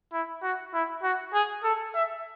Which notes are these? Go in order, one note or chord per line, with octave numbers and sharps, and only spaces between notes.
E4
F#4
E4
F#4
G#4
A4
E5